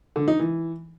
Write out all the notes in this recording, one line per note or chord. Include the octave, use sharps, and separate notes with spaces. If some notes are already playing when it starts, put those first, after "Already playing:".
D3
D#4
E3